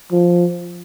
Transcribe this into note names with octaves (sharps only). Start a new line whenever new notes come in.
F3